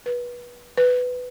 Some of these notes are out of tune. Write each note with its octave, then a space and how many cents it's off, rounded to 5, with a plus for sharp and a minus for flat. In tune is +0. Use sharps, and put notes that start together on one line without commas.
B4 -25
B4 +10